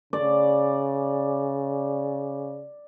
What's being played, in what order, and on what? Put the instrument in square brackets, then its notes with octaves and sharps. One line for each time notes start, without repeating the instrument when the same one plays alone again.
[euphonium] C#3 [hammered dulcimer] D5